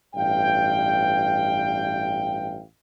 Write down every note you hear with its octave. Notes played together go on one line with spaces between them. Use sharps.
A1 G2 F5 G5